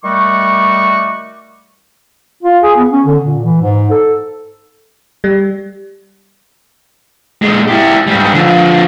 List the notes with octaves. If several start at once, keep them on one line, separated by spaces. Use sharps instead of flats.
D#3 G3 A3 F#4 C#6 D6
F4
G#4
B3
C#4
D3
A#2
E3
G#2
A4
G3
A#2 G#3
E4 G4
G#2 G3
D3 F3